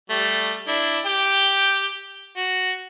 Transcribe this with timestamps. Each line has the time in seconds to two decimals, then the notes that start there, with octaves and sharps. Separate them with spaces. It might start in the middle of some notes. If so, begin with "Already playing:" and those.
0.10 G3 A3
0.68 D4 E4
1.06 G4 G5
2.37 F#4